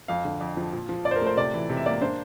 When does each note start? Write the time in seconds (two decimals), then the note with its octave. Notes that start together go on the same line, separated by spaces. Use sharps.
0.08 F2 F5
0.25 D3
0.41 F2
0.57 F3
0.73 A#2
0.89 F3
1.05 A#2 D5
1.11 C5
1.16 A#4
1.21 A3
1.26 C5
1.37 C3 D5
1.54 E3
1.69 C3
1.77 E5
1.86 A#3 D5
2.01 D4 C5